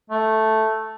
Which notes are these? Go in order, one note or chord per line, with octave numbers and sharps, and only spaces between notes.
A3